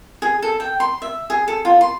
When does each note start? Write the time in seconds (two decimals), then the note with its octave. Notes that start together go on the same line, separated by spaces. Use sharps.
0.22 G#4
0.42 A4
0.60 G5
0.80 C6
1.02 E5
1.30 G#4
1.48 A4
1.65 F4
1.81 C6